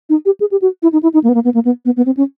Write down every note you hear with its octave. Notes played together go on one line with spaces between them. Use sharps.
D#4
G4
G#4
G4
F#4
E4
D#4
E4
D#4
A#3
B3
A#3
B3
A#3
B3
B3
B3
C4
C#4